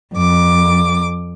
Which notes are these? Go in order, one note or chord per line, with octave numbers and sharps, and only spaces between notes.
F2 D6